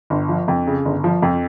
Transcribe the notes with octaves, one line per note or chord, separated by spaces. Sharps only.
G1
F3
F2
C#3
G1
F3
F2